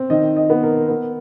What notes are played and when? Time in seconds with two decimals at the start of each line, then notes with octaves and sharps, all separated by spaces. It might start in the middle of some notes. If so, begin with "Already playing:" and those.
Already playing: C4
0.10 D#3 D#5
0.36 D#5
0.50 B3
0.63 A#4
0.89 B3